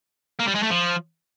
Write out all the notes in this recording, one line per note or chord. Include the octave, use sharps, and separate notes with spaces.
A#3
G3
G#3
A3
F3